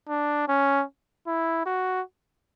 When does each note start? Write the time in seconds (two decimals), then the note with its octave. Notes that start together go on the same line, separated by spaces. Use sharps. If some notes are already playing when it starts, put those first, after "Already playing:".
0.09 D4
0.48 C#4
1.27 E4
1.66 F#4